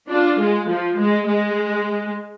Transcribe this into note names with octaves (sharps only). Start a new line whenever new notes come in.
D4 F4
G#3
F3
G#3
G#3